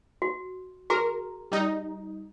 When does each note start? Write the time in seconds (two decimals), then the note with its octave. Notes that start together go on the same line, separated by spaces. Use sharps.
0.22 F#4
0.90 F#4 G#4 A#4 A#5
1.52 G3 D#4